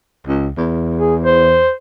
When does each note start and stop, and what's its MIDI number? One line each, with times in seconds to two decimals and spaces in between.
0.27 0.49 37
0.57 1.67 40
1.00 1.15 68
1.24 1.72 72